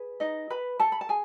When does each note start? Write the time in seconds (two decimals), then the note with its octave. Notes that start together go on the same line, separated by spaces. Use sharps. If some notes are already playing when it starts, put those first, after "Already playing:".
Already playing: G#4 B4
0.20 D#4 D#5
0.50 B4 B5
0.80 A4 A5
0.92 B5
1.01 A5
1.09 G#4 G#5